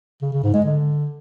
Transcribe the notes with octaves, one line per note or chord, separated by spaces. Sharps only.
C#3
C#3
G#2
G#3
D3